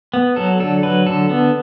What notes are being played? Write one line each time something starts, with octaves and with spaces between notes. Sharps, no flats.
B3
F#3 A4
D3 A4
F#3 B4
D3 A4
B3